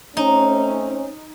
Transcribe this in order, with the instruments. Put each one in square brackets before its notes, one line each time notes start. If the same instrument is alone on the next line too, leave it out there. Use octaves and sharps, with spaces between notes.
[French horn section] A3 C4 C#4 [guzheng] D#4